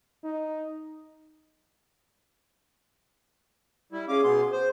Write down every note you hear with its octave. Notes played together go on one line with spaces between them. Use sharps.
D#4
G3 E4
C#4 G#4 F5 D6
B2 B3 C6
C5